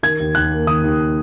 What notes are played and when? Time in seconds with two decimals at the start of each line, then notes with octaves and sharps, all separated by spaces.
0.03 D#3 G#6
0.20 D#2
0.35 D#2 F#6
0.51 A#3
0.67 D#3 D#6
0.84 D#2